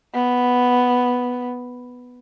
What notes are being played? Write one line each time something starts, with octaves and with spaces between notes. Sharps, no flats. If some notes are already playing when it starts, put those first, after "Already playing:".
B3